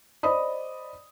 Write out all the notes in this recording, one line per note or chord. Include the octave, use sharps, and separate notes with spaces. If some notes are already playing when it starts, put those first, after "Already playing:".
C5 D5 D#5 B5 D#6